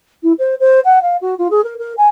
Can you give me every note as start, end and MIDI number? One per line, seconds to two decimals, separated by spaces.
0.23 0.33 64
0.39 0.55 72
0.60 0.80 72
0.85 1.02 78
1.02 1.17 77
1.21 1.35 66
1.38 1.48 65
1.51 1.63 68
1.64 1.74 70
1.79 1.94 70
1.97 2.08 80